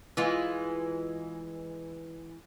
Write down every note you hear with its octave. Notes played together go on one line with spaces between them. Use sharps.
E3 G#3 F4